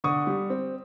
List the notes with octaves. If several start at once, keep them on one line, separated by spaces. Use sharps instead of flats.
D3 C#6 D#6
G3
C4